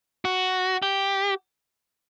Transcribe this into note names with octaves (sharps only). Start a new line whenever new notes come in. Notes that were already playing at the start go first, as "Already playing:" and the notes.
F#4
G4